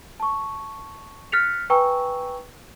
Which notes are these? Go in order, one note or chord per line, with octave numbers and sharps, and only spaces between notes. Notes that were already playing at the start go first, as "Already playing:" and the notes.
A5 C#6
F6 F#6 A6 B6 C#7 F7
B4 G5 G#5 A#5 C#6 E6